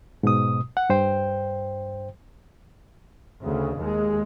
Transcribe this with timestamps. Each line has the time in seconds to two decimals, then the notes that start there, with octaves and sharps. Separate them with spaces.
0.23 G#2 B2 D#6
0.77 F#5
0.90 G2 C5 G5
3.42 D2 C#3
3.78 D#2 G#3